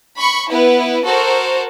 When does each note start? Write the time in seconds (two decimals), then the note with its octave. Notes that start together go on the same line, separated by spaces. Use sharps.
0.16 B5 C#6
0.50 B3 E4 B4
1.04 F#4 A4 A#4 C5